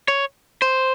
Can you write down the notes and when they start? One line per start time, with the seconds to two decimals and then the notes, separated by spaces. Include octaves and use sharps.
0.08 C#5
0.62 C5